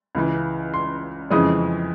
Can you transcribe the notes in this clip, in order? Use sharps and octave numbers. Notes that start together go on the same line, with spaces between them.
C#2 C#3 E3
C6
F2 C#3 E3 G#3 D#6